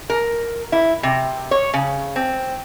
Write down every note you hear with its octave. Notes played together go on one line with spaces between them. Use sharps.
A#4
E4
C3
C#5
C#3
C4